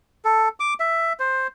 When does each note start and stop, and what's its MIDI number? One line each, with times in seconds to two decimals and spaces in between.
0.25 0.49 69
0.60 0.74 86
0.80 1.13 76
1.20 1.47 72